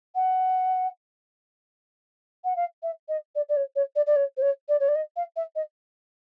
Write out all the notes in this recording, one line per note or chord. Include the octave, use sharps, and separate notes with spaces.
F#5
F#5
F5
E5
D#5
D5
D5
C#5
C#5
D5
D5
C#5
C5
C#5
D5
C#5
D5
D#5
F5
E5
D#5